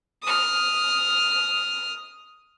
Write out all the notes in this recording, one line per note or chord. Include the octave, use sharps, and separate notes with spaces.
D#6 F6